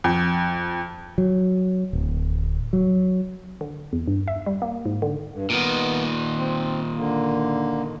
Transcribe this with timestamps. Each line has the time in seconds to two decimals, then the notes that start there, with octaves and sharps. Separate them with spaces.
0.04 F2
1.18 F#3
1.93 D1
2.73 F#3
3.61 D3
3.93 E2
4.07 G2
4.28 E5
4.46 G3
4.62 A#3
4.85 G#2
5.02 D3
5.31 G2
5.50 A#2 D#3 B3
6.37 C4
6.95 D3 A#3